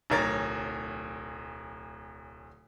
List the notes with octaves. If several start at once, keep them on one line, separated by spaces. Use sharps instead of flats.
D1 B1 A#4 C#5 A6